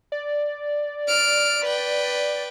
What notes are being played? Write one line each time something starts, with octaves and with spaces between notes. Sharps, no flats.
D5
F6 D7
B4 G5